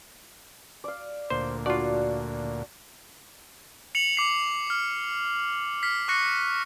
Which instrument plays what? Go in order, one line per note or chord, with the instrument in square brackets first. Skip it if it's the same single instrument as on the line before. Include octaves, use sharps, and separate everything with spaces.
[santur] D5 F5
[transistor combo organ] D2 A#2 [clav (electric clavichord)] C5
[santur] D4 F#4 [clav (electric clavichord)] F4 D5
[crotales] C#7 F7 F#7
D6 C7 C#7
F6
F6 B6 C7
C#6 D6 F#6 A#6 C#7